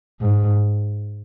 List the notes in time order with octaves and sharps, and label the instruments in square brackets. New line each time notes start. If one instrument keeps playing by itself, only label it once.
[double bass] G#2